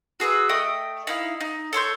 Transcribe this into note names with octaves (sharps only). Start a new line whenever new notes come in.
F#4 G#4 B4 E5
A3 D#5 G5 D#6
D#4 E4 F5
D#4
A4 C#5 C6 G6